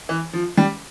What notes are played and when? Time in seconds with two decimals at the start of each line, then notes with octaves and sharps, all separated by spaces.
0.09 E3
0.33 F3
0.57 G3